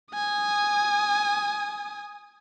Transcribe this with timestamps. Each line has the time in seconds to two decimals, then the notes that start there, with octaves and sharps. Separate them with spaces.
0.15 G#5 D#6